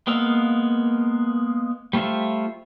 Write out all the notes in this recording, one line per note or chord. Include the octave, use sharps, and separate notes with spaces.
G#3 A#3 B3 F5 E6
G3 A3 F4 C5 E5